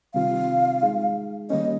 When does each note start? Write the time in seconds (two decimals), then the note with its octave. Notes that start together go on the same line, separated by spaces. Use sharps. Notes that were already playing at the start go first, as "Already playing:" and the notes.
0.14 C3 D#3 G3 C4 F4 F5
0.83 G#3 D#4 G#4
1.50 D#3 G3 A#3 C#4 D#5